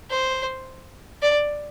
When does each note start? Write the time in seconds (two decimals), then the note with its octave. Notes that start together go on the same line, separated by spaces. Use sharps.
0.10 C5
1.22 D5